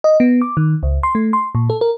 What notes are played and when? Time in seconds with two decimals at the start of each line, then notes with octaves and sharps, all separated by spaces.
0.04 D#5
0.20 B3
0.42 D6
0.57 D#3
0.83 C#2
1.03 C6
1.15 A3
1.33 C6
1.55 A#2
1.70 A4
1.81 A#4